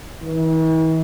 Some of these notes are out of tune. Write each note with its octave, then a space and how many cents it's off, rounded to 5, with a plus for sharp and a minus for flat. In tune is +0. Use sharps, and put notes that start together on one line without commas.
E3 -45